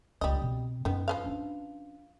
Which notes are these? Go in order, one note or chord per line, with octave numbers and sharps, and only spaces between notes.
C#2 G3 F4 D#5
B2 C4
F#2 D#3 B3
F3 B4 F5
C#4 D4